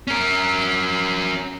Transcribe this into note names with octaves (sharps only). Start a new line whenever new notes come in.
C#4 A#4